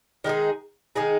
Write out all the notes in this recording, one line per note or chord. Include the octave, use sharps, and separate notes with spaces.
D#3 G#3 D#4 G#4
D#3 G#3 D#4 G#4